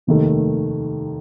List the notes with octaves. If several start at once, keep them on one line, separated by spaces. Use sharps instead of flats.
F1 D#2 D#3 A3